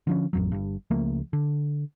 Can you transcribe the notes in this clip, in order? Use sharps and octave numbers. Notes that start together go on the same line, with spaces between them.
D3 F3 C#4
A1 F2 F#3
G1 G2
C#2 F3 A3 A#3
D3